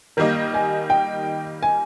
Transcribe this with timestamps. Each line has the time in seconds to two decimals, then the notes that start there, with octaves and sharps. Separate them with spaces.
0.17 D#3 G3 A#3 D#4 A#4
0.54 G#5
0.90 G5
1.63 G#5